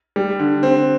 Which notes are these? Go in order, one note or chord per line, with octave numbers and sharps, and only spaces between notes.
G3
D3
C4